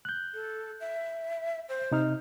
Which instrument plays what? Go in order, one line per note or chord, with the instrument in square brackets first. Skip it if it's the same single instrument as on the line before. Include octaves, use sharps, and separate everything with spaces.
[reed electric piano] F#6 G6
[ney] A4
E5
C5
[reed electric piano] C3 D#4 F6